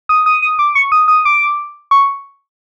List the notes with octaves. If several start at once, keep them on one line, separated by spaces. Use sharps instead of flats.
D#6
D#6
D#6
D6
C#6
D#6
D#6
D6
C#6